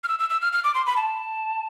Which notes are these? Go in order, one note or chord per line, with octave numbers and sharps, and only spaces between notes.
F6
E6
E6
E6
F6
F6
D6
C6
B5
A5